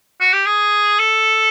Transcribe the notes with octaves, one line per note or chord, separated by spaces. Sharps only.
F#4
G4
G#4
A4